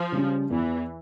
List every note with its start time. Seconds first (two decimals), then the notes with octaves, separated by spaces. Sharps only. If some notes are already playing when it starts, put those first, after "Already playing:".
Already playing: F3
0.12 C#3 G3 C#4
0.50 E2 E3